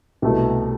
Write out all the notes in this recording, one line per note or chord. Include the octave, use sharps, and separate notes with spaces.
C2 B2 A3